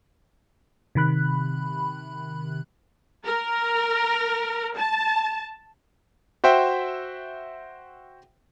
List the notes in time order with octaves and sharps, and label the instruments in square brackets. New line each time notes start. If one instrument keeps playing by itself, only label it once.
[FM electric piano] C3 D#3 B5 F#6
[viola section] A#4
A5
[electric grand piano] F#4 C5 E5 G5